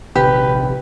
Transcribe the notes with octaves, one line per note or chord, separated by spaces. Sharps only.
A#1 C3 D#3 G4 B4